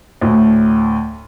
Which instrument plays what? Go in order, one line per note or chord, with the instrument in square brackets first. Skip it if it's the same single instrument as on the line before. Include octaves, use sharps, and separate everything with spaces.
[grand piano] D2 A2